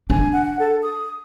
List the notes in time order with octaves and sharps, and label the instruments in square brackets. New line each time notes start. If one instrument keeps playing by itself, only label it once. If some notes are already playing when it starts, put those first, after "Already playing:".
[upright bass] D4 [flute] G#5
[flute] F#5
A4
D#6